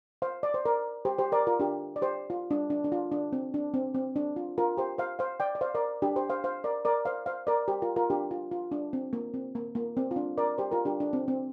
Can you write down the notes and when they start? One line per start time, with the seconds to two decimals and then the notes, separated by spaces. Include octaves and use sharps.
0.22 C5 F5
0.43 D5
0.54 C5
0.65 A#4 D5
1.05 G4 C5
1.18 G4 C5
1.32 A#4 D5
1.47 F4 A#4
1.60 D4 G4
1.96 D5
2.02 G4 C5
2.30 F4
2.51 D4
2.70 D4
2.84 D4
2.92 F4
3.12 D4
3.33 C4
3.54 D4
3.74 C4
3.95 C4
4.16 D4
4.36 F4
4.58 F4 A#4
4.77 G4 C5
4.98 C5 F5
5.19 C5 F5
5.40 D5 G5
5.55 D5
5.61 C5 F5
5.75 A#4 D5
6.02 D4 G4
6.16 G4 C5
6.30 C5 F5
6.44 C5 F5
6.64 A#4 D5
6.85 A#4 D5
7.05 C5 F5
7.26 C5 F5
7.47 A#4 D5
7.68 G4 C5
7.82 F4 A#4
7.96 F4 A#4
8.10 D4 G4
8.31 F4
8.51 F4
8.72 D4
8.93 C4
9.13 A#3
9.34 C4
9.55 A#3
9.75 A#3
9.97 C4
10.11 F4
10.16 D4
10.38 A#4 D5
10.58 G4 C5
10.71 F4 A#4
10.85 D4 G4
11.00 D4
11.13 C4
11.28 C4